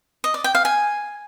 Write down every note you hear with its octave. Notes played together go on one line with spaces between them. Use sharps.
D#5
D5
G5
F5
G#5